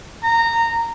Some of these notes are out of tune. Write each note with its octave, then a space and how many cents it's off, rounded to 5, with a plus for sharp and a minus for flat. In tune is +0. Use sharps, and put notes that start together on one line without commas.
A#5 -15